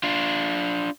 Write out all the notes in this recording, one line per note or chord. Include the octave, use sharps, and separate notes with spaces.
D4 F4